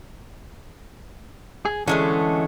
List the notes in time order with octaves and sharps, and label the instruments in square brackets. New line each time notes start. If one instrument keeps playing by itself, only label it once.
[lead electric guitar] G#4
[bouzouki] D3 G#3 A3 [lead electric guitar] E3 C#4